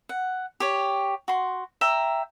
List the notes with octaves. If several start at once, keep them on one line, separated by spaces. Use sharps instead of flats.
F#5
G4 C#5
F#4 C6
E5 G5 A#5